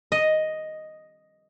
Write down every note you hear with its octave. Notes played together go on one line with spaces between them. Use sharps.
D#5